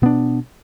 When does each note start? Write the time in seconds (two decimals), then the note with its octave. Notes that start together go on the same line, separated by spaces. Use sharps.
0.02 B2 B3 D4